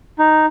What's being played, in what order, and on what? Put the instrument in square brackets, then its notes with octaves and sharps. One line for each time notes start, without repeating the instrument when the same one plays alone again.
[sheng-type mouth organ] D#4